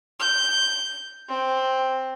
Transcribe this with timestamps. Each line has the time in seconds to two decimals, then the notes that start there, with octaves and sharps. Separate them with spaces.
0.20 G6
1.29 C4